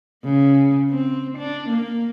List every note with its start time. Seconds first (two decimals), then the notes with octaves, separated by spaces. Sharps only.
0.25 C#3
0.90 C4
1.38 D4
1.69 A#3